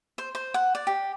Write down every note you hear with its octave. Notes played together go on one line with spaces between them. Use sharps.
C5
C5
F#5
D5
G4